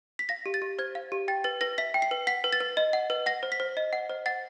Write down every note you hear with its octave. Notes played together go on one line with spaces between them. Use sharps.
B6
F5 A#6
G4
A6
G4
C5 G#6
F5
G4
G5 A6
B4 A6
B4 A#6
E5 B6
G5
C7
B4
F#5 B6
B4
A6
B4
D#5
F#5
B4
F#5 A#6
C5
B6
C5
D#5
F#5
C5
F#5 A6